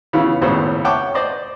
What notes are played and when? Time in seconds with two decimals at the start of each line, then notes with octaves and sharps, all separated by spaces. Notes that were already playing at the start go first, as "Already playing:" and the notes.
0.13 C#3 E3 B3 E4 F4
0.42 G#1 C#2 A2 C#3 B3 C5
0.85 C#5 F#5 G5 A5 D6
1.15 C5 D5 D#5 C6